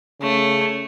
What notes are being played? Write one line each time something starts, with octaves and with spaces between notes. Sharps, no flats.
C#3 A3